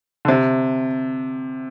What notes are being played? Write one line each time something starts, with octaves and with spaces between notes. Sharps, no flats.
D3
C3